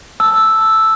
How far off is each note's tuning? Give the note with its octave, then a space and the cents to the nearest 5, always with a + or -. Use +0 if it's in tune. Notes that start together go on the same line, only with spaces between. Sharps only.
A5 +0 E6 +0